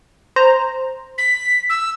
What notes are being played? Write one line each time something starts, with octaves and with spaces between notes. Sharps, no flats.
C5 A#5
B6
E6